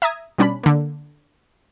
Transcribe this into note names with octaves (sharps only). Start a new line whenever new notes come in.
E5 A#5 D#6 G#6
B2 G3 C#4 D4 B5
D3 A#3